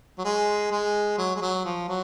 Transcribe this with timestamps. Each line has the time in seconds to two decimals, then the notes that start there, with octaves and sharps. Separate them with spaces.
0.18 F#3
0.25 G#3
0.71 G#3
1.18 F#3
1.36 G#3
1.41 F#3
1.65 F3
1.88 F#3